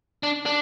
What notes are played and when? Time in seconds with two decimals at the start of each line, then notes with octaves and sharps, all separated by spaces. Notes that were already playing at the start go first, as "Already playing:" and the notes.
0.23 D4
0.46 D4